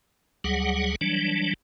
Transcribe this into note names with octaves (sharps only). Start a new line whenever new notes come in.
D2 F#3 G3 G#4 F#5
E3 F#3 G3 D4